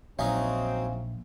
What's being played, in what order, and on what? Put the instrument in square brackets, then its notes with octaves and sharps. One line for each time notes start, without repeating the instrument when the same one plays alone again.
[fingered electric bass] A#1 [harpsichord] F#3 C#4 D#4 [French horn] C4 [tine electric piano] E5 F5 G#5